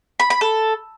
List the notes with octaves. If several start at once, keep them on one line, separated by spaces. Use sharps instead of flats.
B5
B5
A4